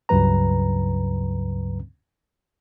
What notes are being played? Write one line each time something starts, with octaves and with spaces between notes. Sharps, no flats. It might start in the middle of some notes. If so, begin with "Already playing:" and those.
C#2 G2 C#3 F#3 B4 A#5